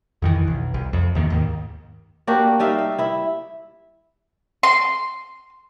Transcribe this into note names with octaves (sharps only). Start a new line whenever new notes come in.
F2 D#3 E3
B1
C2
F2
E2 D#3 E3 A#3
D#2 G#2 D#3
A#3 D4 F#4 G4
G3 D#4 E5 F5
E5
E4 E5
C6